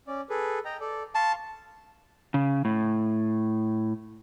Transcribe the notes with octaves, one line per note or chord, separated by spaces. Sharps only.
C#4 D5
G#4 A4 B4
D#5 G5 A#5
A4 D5
F5 A5 C6 C#6
C#3
A2